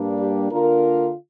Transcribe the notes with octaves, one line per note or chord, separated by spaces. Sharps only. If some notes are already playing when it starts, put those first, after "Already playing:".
Already playing: G2 G3 A#3 D4
G4
D3 A#3 D4 F4 A#4